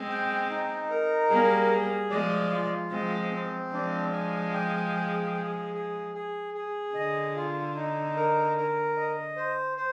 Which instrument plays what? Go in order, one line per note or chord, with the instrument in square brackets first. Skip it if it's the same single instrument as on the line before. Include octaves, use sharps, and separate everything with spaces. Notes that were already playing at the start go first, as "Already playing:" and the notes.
Already playing: [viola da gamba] G#3 C4
[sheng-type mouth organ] G5
D#4
A#4
[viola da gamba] G3 A#3 [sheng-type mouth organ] G#4
[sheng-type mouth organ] G#4
[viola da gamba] F3 G#3 [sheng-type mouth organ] D5
[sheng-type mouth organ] F4
[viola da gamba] F3 G#3 [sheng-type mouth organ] C4
[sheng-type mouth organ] C4
[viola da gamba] F3 G#3 [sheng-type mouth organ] D4
[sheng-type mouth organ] G#5
G5
G#4
G#4
G#4
G#4
G#4
[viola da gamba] D3 [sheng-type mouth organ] D#5
[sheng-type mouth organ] F4
D#4
A#4
A#4
D#5
C5
C5